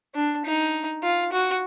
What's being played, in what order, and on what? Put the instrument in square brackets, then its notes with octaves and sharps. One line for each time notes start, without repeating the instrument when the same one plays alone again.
[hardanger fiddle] D4
D#4
F4
F#4